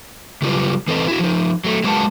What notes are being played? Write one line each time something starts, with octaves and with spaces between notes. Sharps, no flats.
C#3 F#3 G3 F4 B4
E3 C4 A4 B4 D#5
E4 F#4
F3 D#4
F#3 A3
F#3 G#3 A#3 B4 F#5 A5